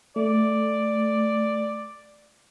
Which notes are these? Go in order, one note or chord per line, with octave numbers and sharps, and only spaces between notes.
A3 D5